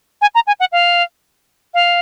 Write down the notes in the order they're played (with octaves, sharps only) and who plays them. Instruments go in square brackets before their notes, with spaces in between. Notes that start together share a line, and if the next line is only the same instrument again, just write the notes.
[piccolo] G#5
A#5
G#5
F#5
F5
F5